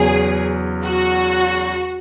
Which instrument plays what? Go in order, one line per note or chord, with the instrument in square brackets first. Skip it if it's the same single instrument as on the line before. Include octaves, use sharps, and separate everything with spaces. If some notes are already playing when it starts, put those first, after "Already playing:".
Already playing: [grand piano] E2 C#3 F#3 C#4 [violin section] G#4
[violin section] F#4